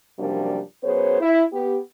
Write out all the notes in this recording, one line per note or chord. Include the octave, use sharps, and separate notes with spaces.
F#2 C3 F3 G3 A#3 D4
F#2 B3 G#4 C5 C#5
E4
B3 G4